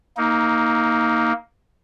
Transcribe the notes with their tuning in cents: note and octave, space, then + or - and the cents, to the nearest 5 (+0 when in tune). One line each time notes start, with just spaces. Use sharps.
A#3 +0 D#4 +20